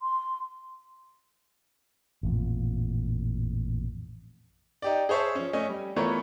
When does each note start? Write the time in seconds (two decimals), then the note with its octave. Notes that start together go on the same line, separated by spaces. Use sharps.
0.02 C6
2.23 A1 F2 A#2
4.82 D#4 G4 D5
5.09 G#4 C5 C#5 E5 A5
5.35 F3 C#4
5.53 A3 C#4 D#5 G#5
5.69 G3
5.96 E3 A3 B3 F4 A#4 C#5